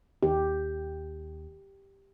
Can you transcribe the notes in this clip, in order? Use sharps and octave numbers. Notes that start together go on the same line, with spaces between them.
D#2 G4